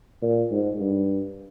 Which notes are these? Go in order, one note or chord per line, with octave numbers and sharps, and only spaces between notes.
A#2
G#2
G2